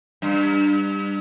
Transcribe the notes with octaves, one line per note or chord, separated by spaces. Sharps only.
G2